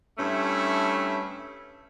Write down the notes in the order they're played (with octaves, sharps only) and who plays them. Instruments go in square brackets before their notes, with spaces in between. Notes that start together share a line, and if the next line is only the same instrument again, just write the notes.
[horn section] G2 A3 C#4 E4